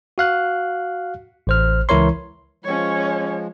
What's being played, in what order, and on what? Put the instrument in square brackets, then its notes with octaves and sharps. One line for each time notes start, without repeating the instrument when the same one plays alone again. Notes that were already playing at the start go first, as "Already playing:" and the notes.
[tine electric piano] F#4 F5 F#6
A1 C5 F6
C#2 E3 E4 A#4 C#5 C6
[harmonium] F3 G#3 [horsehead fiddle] C#4 C#5